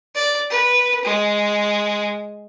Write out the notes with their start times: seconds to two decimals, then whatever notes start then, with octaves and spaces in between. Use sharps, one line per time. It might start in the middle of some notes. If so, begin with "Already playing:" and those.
0.15 D5
0.50 B4
1.05 G#3